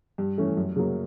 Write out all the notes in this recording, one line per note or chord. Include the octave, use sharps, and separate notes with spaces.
G2
E3 A3 C#4
F#2
C#3 F#3 A#3